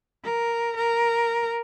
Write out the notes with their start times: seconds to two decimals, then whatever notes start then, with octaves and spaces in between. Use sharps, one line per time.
0.24 A#4
0.76 A#4